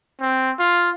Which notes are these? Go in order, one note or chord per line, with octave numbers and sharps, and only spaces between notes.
C4
F4